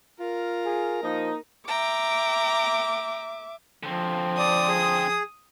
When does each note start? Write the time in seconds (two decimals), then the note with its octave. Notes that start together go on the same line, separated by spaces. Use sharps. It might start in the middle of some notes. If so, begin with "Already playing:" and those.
0.20 F4 A#4
0.65 G#4
1.03 F3 A#3 D#4
1.68 E5 G5 A#5 D6
3.83 D3 F3 C4
4.38 D5 D#6
4.68 G#4